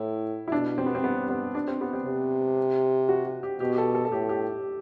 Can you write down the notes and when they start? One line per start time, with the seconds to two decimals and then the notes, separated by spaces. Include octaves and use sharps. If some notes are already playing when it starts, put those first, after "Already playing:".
Already playing: A2 E4
0.48 E4
0.52 B2 D4
0.78 C4
0.86 B3
0.95 C4
1.04 G2 B3
1.29 B3
1.55 D4
1.68 C4
1.81 B3
1.93 C4
2.06 C3
3.09 F#4
3.26 F#4
3.43 G4
3.60 B2 G4
3.73 G4
3.78 A4
3.95 A4
4.05 A4
4.11 A2 G4
4.29 G4